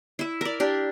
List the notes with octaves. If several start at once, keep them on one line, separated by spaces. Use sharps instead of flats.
E4 E5
A#4 D5
D4 G4 A#4